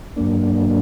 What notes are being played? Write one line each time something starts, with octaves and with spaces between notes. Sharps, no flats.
G2 F#3 A#3 D4